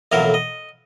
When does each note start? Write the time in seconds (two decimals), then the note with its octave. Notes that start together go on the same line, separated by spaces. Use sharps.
0.12 B1 F2 A2 E3 F#3 A#4
0.34 D#5